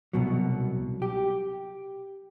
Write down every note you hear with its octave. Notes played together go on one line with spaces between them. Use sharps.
C2 B2 F#3
G4